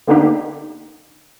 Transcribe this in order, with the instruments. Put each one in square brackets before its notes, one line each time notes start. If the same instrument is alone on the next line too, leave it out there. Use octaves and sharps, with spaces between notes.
[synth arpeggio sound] D3 A#3 B3 D4 D#4 G4